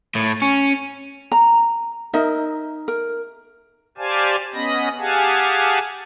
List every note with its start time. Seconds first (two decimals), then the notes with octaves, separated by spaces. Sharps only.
0.15 A2
0.42 C#4
1.32 A#5
2.14 D#4 A#4 D#5 E5
2.88 A#4
3.98 G4 C5 D5 F5 G#5 A5
4.54 B3 C#4 D#5 B5 A#6
4.99 G4 G#4 F5 F#5 G#5 A5